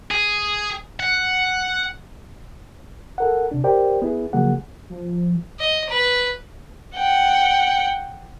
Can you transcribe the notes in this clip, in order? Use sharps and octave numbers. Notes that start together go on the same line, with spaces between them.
G#4
F#5
A4 A#4 F#5
C3 D4
G4 A#4 C5 D5 G5
B3 E4 G#4
C#3 F3 F#3 A#3 G#4 F#5
F3
D#5
B4
F#5 G5